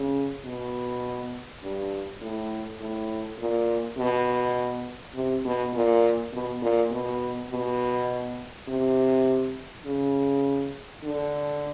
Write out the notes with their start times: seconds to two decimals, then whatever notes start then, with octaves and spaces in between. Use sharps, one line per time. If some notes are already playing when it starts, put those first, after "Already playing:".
Already playing: C#3
0.45 B2
1.63 G2
2.21 A2
2.80 A2
3.38 A#2
3.98 B2
5.15 C3
5.45 B2
5.74 A#2
6.33 B2
6.62 A#2
6.91 B2
7.51 B2
8.68 C3
9.86 C#3
11.04 D3